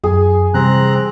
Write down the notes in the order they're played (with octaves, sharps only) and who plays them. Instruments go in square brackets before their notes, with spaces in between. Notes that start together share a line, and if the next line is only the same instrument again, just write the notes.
[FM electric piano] F#2 [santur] G#4
[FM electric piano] C3 E3 G3 [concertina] C4 A#5 F#6